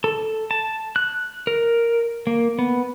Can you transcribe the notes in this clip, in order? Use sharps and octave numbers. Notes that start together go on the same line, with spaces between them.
A4
A5
F#6
A#4
A#3
B3